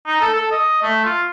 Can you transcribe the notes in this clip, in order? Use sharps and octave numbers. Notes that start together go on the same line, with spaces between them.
D#4
A4
A4
D#5
A3
F4